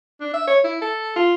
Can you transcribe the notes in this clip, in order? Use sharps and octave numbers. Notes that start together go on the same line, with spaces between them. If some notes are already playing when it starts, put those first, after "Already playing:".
D4
E5
C#5
E4
A4
F4